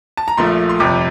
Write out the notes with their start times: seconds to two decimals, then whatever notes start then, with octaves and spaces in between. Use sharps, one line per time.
0.17 A5
0.28 A#5
0.37 A#1 A#2 F3 A3 C6
0.69 C6
0.79 G1 F2 C3 G3 D6